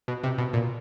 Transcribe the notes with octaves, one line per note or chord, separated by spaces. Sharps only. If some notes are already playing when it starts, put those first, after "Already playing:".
B2
C3
B2
A#2